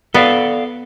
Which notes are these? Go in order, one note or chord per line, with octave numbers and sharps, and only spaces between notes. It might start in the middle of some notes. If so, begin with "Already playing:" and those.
B3 A4 D5 F5